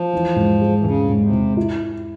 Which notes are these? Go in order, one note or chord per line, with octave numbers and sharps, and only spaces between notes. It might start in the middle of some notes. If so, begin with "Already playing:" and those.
Already playing: F3
E3
G#2
G#3
E3
G#2 C#3
G#2
C#3
C3
G#2
E4